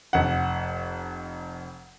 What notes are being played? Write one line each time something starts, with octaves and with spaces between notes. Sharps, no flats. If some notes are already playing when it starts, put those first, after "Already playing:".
F1 F#5